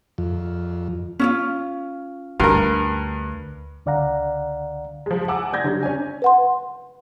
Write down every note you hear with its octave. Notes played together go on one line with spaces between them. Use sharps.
F2
C#4 E4 F4
D2 G2 A#4
C#2 D3 D5 F5 F#5 A#5
F3 G#3
F#5 G#5 A5 D6 E6
F#1 D5 G6 G#6 A#6
D3 F#3 G3
C#4 D4 G#5
B4 F#5 C6